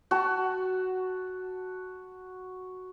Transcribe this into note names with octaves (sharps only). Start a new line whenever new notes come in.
F#4 A5